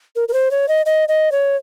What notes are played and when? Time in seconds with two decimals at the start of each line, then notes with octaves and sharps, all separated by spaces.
0.16 A#4
0.28 A#4
0.33 C5
0.51 C#5
0.68 D#5
0.86 D#5
1.08 D#5
1.32 C#5